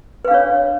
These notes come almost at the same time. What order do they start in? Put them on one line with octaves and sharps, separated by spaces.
B4 F5 D4 C#5